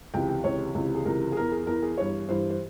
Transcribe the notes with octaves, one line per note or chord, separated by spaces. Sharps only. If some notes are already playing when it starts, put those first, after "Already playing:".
C#2 C3 E3 G5
G5
C#2 C3 E3 C#5
C#2 C3 E3
G#4
C#2 C3 E3 A#4
G#4
E2 E3 A#4
G#4
E2 E3 A#4
G#4
G2 E3 C#5
G2 E3 C5
C5